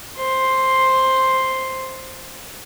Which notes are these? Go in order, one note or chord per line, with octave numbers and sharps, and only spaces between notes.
C5 C6